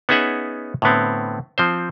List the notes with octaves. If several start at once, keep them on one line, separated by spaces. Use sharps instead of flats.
B3 C#4 D#4 G#4 E5 F#5
A2 D3 B3 C4
F3 C4 C5